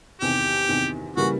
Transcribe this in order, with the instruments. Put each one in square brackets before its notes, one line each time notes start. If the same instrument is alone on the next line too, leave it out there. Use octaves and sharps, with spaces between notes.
[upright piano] E2 C3 D#3 [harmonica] G4
[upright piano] E2 C3 D#3
[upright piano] C#3 E3 G3 A#3 [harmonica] F#4